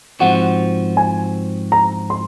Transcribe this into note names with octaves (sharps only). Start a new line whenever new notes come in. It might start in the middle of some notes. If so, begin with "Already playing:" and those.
G#2 F3 C4 F#4 F#5
G#5
A#5
C6